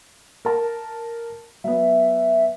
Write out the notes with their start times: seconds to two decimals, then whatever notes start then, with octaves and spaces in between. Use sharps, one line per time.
0.45 A#4 A5
1.64 F#3 B3 E5